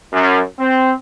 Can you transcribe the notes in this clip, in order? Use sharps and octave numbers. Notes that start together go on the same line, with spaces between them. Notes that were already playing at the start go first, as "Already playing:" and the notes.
F#2
C4